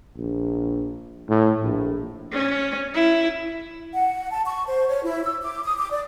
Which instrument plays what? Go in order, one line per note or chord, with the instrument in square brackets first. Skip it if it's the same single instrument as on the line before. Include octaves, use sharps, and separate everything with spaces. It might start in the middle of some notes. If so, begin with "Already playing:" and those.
[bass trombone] A#1
A2
A#1
[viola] C#4
E4
[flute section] F#5
A5
C#6
C5
C#5
E4
E6
D6
D#6
D6
D5